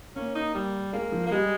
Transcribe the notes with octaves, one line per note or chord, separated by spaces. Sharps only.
A#3 C#4
D#4
G3
G#3 A#3
F3
A#3
G3 G#3